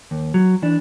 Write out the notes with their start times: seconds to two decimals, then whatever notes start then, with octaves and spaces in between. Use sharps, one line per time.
0.11 D#2
0.34 F#3
0.62 E3 D4